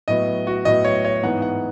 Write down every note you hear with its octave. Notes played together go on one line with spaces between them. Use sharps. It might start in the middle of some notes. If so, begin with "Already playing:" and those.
A2 F#3 B3 D#5
F#4
A2 F#3 B3 D#5
C#5
C#5
G#2 E3 B3 F#5
F#5